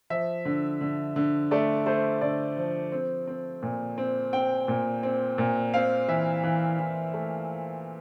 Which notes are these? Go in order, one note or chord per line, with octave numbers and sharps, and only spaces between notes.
F3 E5
D3
D3
D3
A3 D5
A3 C5
D3 D5
F3
C4
C4
A#2
C4
C4 G5
A#2
C4
A#2
C4 F5
E3 E5
E3
E3
A3